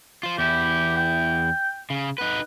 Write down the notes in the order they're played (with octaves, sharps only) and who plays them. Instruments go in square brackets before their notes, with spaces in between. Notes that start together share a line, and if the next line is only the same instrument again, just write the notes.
[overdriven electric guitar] F4 C5
[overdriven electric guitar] E2 E4 [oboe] G4
[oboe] G5
[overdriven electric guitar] C#3
[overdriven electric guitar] D#4 B4 [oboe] F#5